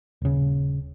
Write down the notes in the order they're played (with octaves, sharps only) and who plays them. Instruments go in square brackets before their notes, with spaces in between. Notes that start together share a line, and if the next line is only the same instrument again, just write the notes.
[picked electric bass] D#1 C#3